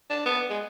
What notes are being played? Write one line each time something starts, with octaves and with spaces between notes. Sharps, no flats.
D4
B3
G#3